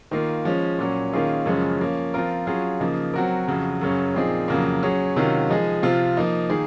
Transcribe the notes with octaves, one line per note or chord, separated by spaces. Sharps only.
D#3 A#3 F4
F3 G#3 C#4
A#2 F#3 C#4
D#3 A#3 C#4 F4 G#4
F#2 C#3 F3 G#3 C#4
F3 A#3 C#4
F3 C4 F4 A#4
F#3 C#4 F4 G#4
C#3 F3 A#3 D#4
F#3 C4 F#4 A#4
F2 C#3 F#3
F#2 C#3 F#3 C#4
A#2 F3 C4 D#4 G#4
F2 C#3 F#3 A#3
F#3 C#4 G#4
C3 D#3 F#3 C#4 F4
F3 G#3 D#4 G#4
C3 F3 C4 F4
F3 A#3 D#4
D#3 A#3 D#4 G#4